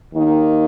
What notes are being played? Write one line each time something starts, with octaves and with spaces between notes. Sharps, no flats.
D#2 D#3 A#3 D#4